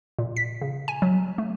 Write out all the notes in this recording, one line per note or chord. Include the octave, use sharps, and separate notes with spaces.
A#2
B6
C#3
G#5
F#3
A3